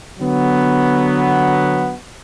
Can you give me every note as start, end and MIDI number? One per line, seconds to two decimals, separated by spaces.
0.19 1.94 50
0.19 1.94 54
0.19 1.94 59